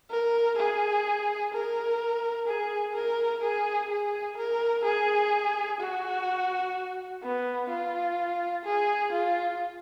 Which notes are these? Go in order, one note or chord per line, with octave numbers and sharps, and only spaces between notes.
A#4
G#4
A#4
G#4
A#4
G#4
G#4
A#4
G#4
F#4
B3
F4
G#4
F4